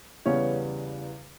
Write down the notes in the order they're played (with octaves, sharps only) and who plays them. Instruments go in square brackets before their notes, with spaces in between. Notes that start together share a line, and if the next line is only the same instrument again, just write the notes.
[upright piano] E2 C#3 E3 G3 B3 C#4 C#5